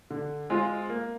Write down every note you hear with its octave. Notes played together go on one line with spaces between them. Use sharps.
D3
G#3 C4 F4
A#3